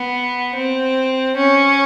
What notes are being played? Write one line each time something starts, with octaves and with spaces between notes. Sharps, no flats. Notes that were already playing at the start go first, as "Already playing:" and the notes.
Already playing: B3
C4
C#4